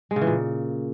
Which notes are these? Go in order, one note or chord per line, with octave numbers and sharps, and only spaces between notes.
G#3
C#3
E3
A#2